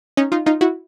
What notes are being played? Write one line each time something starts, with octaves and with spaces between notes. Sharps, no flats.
C#4 D#4
D#4 F4
D#4 F4
E4 F#4